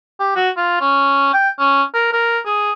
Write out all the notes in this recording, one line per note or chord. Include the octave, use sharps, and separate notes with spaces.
G4
F#4
F4
C#4
G5
C#4
A#4
A#4
G#4